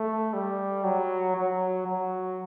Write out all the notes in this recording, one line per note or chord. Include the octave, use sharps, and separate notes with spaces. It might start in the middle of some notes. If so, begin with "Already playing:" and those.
Already playing: A3
G3
F#3
F#3
F#3